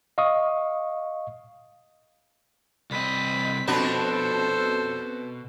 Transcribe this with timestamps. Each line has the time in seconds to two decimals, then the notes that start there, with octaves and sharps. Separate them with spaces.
0.18 D#5 F5 C#6 D#6
2.91 C2 C4 D#5 B5
3.68 F2 B2 D4 F#4 A4 C5